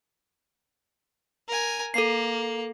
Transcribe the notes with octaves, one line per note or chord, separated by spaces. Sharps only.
A#4 G#5
A#3 A4 C7